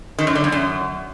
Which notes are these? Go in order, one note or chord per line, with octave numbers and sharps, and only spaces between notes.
D#3
F#2
D3
E2
F#2